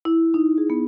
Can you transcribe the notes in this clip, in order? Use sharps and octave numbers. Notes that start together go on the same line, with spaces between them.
E4
D#4
G#4
B3